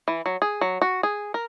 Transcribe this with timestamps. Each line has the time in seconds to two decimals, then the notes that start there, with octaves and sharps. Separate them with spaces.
0.08 E3
0.26 F#3
0.42 G#4
0.61 F#3
0.82 F#4
1.03 G#4
1.34 A#4